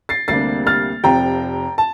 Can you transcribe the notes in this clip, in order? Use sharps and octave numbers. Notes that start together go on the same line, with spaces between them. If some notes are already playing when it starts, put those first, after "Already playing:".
A6 C7
D2 C3 G3 A#3 D4 A6 C7
F6 A6
F1 F2 C3 F3 G5 A#5
A5